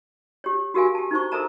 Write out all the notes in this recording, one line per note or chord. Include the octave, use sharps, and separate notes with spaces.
G4 C#5
F#4 G4 A#4 F5 G#5
G4 A5
D#4 E4 C5 C#6
A4 A#4 C5 E5 A5 A#5